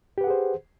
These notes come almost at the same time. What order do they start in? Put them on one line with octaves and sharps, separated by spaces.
G4 B4 F#5 G#4 C5